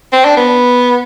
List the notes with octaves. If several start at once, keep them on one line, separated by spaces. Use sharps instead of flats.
C4
D4
B3